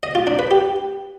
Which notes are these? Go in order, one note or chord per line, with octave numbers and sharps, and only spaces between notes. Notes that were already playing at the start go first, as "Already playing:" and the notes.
D#5
F4
D4
B4
G4